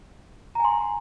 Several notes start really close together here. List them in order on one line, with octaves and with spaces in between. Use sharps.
A#5 G#5 C6